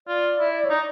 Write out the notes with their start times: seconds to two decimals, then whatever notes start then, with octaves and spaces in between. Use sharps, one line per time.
0.07 F4 D5
0.39 E4
0.65 C#5
0.70 D#4 D5